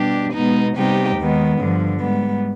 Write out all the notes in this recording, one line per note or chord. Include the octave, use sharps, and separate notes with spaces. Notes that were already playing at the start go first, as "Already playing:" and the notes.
Already playing: B2 G3 D4 G4
B2 G#3 B3 D#4
C3 G3 B3 D#4 G4
D#2 D#3 G#3 B3
G2 D3 F3
G#2 G3 B3